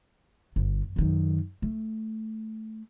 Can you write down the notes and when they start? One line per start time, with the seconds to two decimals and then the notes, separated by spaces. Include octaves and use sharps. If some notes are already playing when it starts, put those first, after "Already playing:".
0.56 G1
0.96 F#2 D#3
1.62 A3